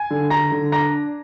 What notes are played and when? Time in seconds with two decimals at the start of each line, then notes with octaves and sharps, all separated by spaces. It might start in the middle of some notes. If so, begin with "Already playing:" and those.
Already playing: G#5 G#6
0.11 D3
0.30 D3 A#5 A#6
0.52 D3
0.72 D4 A#5 A#6